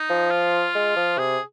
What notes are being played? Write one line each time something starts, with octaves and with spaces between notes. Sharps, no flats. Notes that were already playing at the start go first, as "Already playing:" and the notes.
Already playing: D#4
F3
F4
G#3
F3
C3 G#4